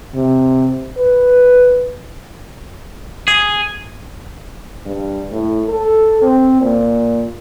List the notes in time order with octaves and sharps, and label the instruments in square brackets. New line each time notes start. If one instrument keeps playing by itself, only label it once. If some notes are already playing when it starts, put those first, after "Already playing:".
[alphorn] C3
B4
[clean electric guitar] G#4
[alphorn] G2
A2
A4
C4
A#2